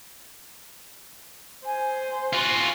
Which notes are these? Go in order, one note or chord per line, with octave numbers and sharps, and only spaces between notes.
C5 G#5
F4 F#4 G#5